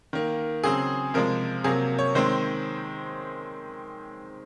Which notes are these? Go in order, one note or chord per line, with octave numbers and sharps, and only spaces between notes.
D#3 A#3
C#3 F#3 C4 G#4
C3 F3 G#3 A#4
C3 F#3 A#3 G#4
C#5
D#3 G#3 C4 C5